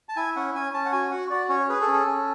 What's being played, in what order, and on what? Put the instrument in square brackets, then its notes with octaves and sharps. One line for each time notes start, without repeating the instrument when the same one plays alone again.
[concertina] A5
E4 G#5
C#4 F#5
C#4 G#5
C#4 A5
F#5
F#4 G#5
F#4 F#5
F#4 D5
C#4 C#5
G#4 B4
A4
C#4
A4
C#4